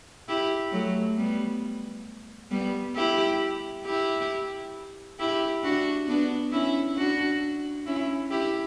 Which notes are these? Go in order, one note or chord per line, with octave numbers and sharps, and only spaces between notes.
E4 G4
F#3 A3
G3 B3
G3 B3
E4 G4
E4 G4
E4 G4
D4 F#4
B3 D4
C#4 E4
D4 F#4
C#4 E4
E4 G4